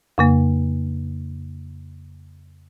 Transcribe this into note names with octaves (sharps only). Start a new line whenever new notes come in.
F2 C#3 A#3